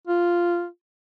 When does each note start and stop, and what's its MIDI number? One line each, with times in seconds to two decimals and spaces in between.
0.07 0.67 65